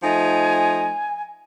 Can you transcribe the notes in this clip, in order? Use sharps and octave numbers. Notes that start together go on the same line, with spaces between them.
F3 A3 D#4 G#5